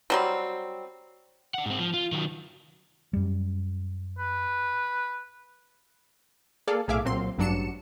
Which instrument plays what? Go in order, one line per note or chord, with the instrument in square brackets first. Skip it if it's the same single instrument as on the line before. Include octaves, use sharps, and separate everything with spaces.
[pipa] F#3 G3 C4
[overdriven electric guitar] D4 F#5
G#2 C4
F3
F4
D#3 F#3
[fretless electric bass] F#2 G3
[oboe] B4
[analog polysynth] A#3 G#4 A4 D5 F5
B1 A2 G#4 E5 F5 D6
C2 A#2 F#3 C4 C6
A1 G2 F#3 D4 C#7 E7